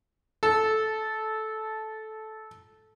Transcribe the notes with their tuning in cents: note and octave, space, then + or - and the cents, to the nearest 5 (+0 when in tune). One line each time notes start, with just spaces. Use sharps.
A4 -15